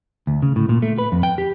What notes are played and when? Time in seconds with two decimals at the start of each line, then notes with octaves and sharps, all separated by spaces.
0.27 D2
0.42 C#3
0.56 A2
0.69 A#2
0.82 A3
0.98 B4
1.12 F2
1.23 G5
1.38 G4